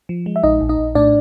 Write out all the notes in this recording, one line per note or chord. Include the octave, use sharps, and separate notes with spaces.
F3
G#3
E5
A#1 D#4 D#5
A#1
D#4 D#5
A#1
A2 D4 D5